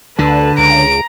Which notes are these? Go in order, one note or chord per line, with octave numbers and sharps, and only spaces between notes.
D2 D3 B4 A5
C#2 A#5 D7